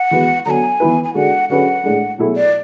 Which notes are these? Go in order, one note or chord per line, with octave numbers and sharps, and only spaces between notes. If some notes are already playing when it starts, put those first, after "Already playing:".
Already playing: F#5
E3 G#3 B3 F#4 B4
D3 F#3 B3 G#5 A#5
E3 B3 E4 B4
G#5
D3 G#3 D4 F#4 F#5
D3 F#3 C#4 G#4 B4 F#5
A2 G#3 D4
B2 F#3 A3 E4 G#4
D5